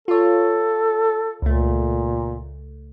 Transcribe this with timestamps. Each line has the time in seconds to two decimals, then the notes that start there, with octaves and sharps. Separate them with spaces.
0.08 F4 A4 C#5
1.42 C#2 A#2 A3